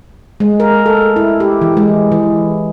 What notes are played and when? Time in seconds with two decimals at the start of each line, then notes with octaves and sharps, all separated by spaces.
0.40 G#3
0.60 A#4
0.86 A4
1.16 E4
1.40 G4
1.61 E3
1.77 G#3
2.12 E3